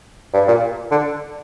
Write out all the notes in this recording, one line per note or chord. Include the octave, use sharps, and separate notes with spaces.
G2
A#2
D3